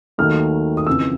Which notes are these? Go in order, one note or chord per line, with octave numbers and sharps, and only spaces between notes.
D#2 D#3 F#3 A3 F6
D#6
F2 C#3 E3 E6